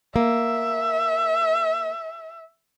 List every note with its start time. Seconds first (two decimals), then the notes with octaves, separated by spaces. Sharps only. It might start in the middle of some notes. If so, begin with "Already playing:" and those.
0.16 A#3 E5